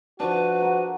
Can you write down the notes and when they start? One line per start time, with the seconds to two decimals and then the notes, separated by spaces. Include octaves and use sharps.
0.20 F3 D4 F#4 B4
0.62 A#4 F#5